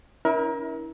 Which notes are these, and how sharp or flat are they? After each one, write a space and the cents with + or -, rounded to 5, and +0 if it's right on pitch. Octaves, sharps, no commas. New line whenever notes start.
C#4 +30 E4 -30 A#4 +25